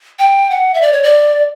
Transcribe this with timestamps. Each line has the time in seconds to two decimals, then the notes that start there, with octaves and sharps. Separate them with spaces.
0.19 G5
0.50 F#5
0.74 E5
0.82 D5
0.93 C#5
1.03 D5